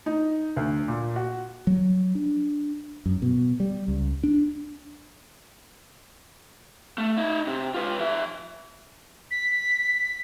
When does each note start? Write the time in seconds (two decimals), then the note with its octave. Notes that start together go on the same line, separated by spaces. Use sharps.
0.06 D#4
0.56 D2
0.88 A#2
1.16 F#4
1.67 F#3
2.15 D4
3.06 F#2
3.22 B2
3.60 G3
3.88 C#2
4.24 D4
6.98 A3
7.17 D#4 E5
7.47 C3
7.74 F4 B4
8.00 F3 E5
9.31 B6